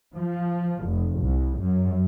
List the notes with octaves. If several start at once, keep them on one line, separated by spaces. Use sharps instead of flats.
F3
F1
C2
F#2